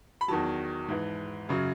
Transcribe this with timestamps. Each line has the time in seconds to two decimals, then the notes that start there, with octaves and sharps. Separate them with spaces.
0.21 B5
0.28 E2 D#3 F#3 A5
0.88 G#2 E3
1.49 F#2 C#3 F#3